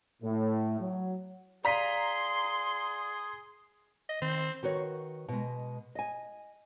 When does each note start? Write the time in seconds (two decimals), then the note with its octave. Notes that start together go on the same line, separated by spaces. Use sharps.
0.22 A2
0.80 F#3
1.65 G#4 D5 F5 A#5 C6 B6 D#7
4.09 D#5
4.22 D#3 C4
4.63 D#3 F#4 B4 C#5
5.28 B2 G#3
5.95 D#5 G#5